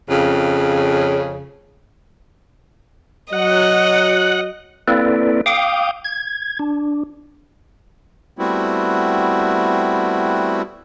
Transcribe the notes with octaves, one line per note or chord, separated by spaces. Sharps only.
F2 C#3
F#3 D#5 F#5
A#3 C4 E4 A4 B4 D5
F5 G5 D6 D#6
G#6
D4
G3 A3 B3 C4 E4 F#4